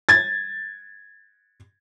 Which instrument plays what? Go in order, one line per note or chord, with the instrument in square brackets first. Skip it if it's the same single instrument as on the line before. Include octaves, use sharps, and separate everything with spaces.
[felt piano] G#6 A6